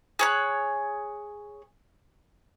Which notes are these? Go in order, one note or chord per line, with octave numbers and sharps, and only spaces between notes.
G#4 C#5 F#6